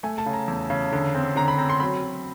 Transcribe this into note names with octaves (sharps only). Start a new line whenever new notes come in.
A3 G#5
A5
C#3
A#5
E2
C#3
D3
C4
D3 A#5
B5
C4 A#5
C6
F#3 B5
F#3